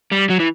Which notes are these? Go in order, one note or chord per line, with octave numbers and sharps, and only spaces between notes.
G3
F#3
E3